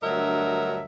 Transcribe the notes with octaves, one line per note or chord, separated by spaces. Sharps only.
D2 G2 F#3 A#4 D#5 E5